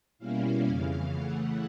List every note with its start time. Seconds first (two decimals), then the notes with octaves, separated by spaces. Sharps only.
0.18 B2 G3 A#3 C#4 E4 F5
0.65 F2 C#3 E3
1.13 C#3 E3 A3 F#5